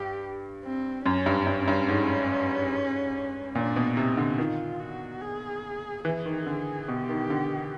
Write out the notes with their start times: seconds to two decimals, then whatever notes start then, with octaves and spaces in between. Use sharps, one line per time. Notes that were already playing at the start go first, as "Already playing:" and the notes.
Already playing: G2 G4
0.64 C4
1.06 F#2 C#4
1.26 G2
1.47 G2
1.68 G2
1.89 G#2
3.55 A#2 D4
3.76 B2
3.97 C3 D#4
4.17 D3
4.38 D#3 F4
4.80 F#4
5.21 G#4
6.05 E3 G#4
6.26 D#3
6.47 D3
6.88 B2 G4
7.09 D#3
7.30 D3